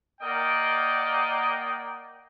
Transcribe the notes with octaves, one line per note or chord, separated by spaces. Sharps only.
A#3 A#4 D5 D#5 F#5 G5